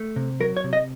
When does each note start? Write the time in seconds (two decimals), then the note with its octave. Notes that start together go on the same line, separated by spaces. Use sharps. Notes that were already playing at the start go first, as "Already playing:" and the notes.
Already playing: A3
0.16 C3
0.40 F#3 A#4
0.57 C#5
0.64 C3
0.73 D#5